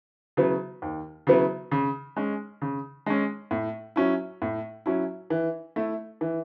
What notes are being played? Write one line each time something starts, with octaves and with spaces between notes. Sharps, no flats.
C#3 F#3 B3 E4
D#2
C#3 F#3 B3 E4
C#3
G#3 C#4
C#3
G#3 C#4
A2
F#3 C#4 E4
A2
F#3 C#4 E4
E3
A3 E4
E3